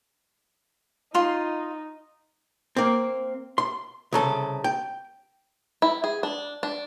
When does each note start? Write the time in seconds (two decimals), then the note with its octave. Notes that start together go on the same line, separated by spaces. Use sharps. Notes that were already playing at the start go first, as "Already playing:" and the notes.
1.15 D#4 F4 C6
2.76 A#3 C4
3.58 C6
4.12 C2 C#3 A4
4.64 G5
5.82 E4
6.04 G#4
6.23 D4
6.63 D4